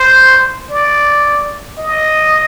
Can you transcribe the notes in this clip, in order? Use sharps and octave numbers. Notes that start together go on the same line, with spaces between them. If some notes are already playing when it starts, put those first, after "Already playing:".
Already playing: C5
D5
D#5